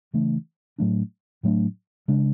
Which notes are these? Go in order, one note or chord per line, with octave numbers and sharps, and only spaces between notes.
C#3 E3 A3 D4
A2 F#3 A3 D4
A2 F#3 A3 D4
C#3 G#3 D4